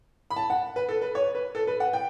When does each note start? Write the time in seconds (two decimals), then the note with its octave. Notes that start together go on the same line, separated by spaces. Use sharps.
0.30 B5
0.36 A5
0.50 F#5
0.76 B4
0.89 A4
1.02 B4
1.15 C#5
1.35 B4
1.55 A4
1.67 B4
1.80 F#5
1.93 G5